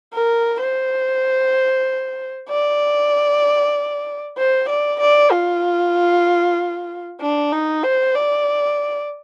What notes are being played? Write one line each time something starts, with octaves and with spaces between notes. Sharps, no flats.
A#4
C5
D5
C5
D5
D5
F4
D4
D#4
C5
D5